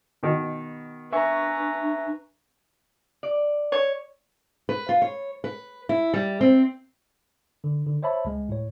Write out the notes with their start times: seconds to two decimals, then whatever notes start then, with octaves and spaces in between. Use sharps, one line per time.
0.23 B2 D#3
1.12 D4 B4 E5 G#5 A#5 C#6
3.23 D5
3.72 C#5
4.69 B4
4.89 F4
5.02 C#5
5.44 B4
5.89 E4
6.14 G3
6.41 C4
7.64 D3
7.86 D3
8.03 C5 C#5 E5 A5 B5
8.25 C#2 G#3
8.49 A2 C#5